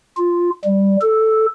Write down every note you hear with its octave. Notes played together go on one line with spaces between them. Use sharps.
F4
G3
A4